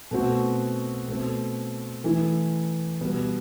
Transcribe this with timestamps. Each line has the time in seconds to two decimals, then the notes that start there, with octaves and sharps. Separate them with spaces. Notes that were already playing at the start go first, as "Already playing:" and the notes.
0.11 B2 A3 C4 F#4
1.07 B2 A3 C4
2.04 E3 A3 E4
3.01 B2 G3 B3